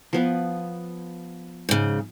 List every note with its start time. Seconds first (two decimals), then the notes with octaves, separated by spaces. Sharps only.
0.13 F3 B3 B4
1.69 G#2 C#3